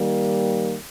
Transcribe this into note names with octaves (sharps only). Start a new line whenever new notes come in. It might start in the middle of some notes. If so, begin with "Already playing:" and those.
Already playing: D#3 G3 A#3